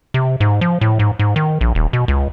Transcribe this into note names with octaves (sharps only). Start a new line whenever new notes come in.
C3
G#2
F3
A2
G#2
G#2
D#3
A#1
D#1
B2
C#2